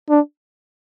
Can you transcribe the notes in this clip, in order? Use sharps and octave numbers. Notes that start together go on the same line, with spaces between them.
D4